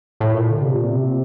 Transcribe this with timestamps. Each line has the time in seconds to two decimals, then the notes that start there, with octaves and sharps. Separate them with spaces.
0.20 A2
0.34 A#2
0.49 D3
0.62 C3
0.75 A#2
0.87 C3